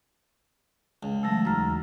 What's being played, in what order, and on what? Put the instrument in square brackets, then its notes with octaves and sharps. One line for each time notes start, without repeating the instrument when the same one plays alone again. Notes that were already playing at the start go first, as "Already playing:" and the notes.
[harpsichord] C#2
[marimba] E3 F#3 A3 [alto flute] A5 [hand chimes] E6 A6 A#6
[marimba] D#2 F6 A6 [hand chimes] D#4 F#4 [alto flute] A#5
[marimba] E2